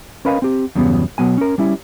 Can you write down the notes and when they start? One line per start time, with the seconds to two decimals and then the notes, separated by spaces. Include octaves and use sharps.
0.25 C#4 A#4 B4 D#5 F5 G#5
0.42 C4 G4
0.75 E2 G2 C#3 F#3 B3
1.18 B2 F#3 B3 G#5
1.37 C#4 A#4
1.58 G3 C#4 E4